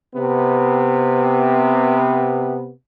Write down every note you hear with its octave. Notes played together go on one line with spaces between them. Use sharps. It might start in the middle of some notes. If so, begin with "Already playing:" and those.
C3 B3